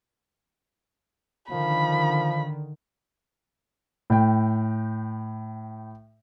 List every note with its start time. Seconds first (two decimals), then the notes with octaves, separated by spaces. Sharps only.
1.52 D3 D#3 F3 B5
4.10 A2 G5